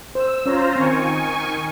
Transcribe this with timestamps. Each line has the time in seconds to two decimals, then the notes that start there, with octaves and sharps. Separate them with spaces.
0.15 C5 E6
0.46 C#4 F4 C5 C#5 A#5
0.76 D#3 C4 G#5 C#6